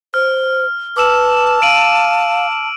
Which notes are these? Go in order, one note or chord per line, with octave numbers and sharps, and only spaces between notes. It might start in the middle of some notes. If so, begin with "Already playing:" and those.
C5 F6
B4 A5 D6 E6 E7
F5 D7 D#7 F#7